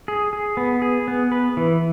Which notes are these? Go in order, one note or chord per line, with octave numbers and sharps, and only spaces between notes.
G#4
G#4
B3
G#4
B3
B4
E3